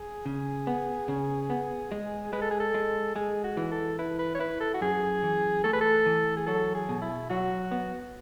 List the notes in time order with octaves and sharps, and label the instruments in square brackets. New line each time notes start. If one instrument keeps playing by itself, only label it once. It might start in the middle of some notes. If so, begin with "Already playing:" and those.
Already playing: [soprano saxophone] G#4
[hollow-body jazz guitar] C#3
B3
C#3
B3
G#3
[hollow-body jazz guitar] G#3 [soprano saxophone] B4
[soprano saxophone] A4
G#4
A4
[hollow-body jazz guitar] G#3
[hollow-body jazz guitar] G#3 [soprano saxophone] G#4
[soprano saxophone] F#4
[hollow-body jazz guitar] E3
[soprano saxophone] A4
[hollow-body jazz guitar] E4 [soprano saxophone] B4
[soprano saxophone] B4
C#5
[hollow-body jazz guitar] E4 [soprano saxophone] B4
[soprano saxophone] A4
F#4
[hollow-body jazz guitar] F#2 [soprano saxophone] G#4
[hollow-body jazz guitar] E3
[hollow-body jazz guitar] A3 [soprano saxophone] A4
[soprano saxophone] B4
A4
[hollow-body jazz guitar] E3
[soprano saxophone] G#4
[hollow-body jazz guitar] F#3 [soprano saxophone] A4
[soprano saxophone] G#4
[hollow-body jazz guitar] B2
[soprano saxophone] E4
[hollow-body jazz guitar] F#3 [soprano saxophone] F#4
[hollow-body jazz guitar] B3